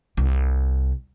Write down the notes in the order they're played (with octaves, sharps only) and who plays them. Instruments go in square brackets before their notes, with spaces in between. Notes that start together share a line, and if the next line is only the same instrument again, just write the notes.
[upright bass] C2